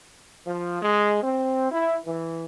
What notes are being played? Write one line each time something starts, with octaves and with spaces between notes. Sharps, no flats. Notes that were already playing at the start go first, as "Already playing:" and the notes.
F3
G#3
C4
E4
E3